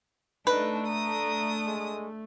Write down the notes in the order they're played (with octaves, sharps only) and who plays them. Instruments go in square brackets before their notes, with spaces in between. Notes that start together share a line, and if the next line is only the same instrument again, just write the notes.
[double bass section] A3 [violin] D4 D#4 [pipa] B4
[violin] D4 D#6 [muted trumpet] A#5
[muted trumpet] G#3